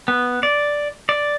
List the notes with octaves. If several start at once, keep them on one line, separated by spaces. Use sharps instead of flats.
B3
D5
D5